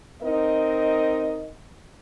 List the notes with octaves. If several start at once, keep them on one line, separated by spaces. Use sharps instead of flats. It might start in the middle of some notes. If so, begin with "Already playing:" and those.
C4 D#4 A#4 D#5